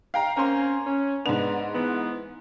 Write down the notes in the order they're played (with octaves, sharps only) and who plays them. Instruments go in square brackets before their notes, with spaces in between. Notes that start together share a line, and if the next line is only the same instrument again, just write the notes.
[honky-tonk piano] F5 G5 A#5
[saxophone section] A#3 C4 C#4 [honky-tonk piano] A#5 C6
[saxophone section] C#4
[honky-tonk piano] G#2 F7 [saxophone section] B3 D4
[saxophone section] E3 B3